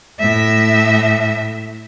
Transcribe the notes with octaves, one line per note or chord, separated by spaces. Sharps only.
A2 E5